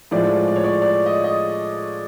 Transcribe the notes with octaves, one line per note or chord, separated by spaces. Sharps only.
A2 F3 G#3 D5
D5
C#5
D5
D5
D#5
D#5